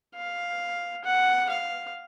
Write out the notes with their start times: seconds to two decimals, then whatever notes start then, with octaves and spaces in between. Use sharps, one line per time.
0.15 F5
1.04 F#5
1.49 F5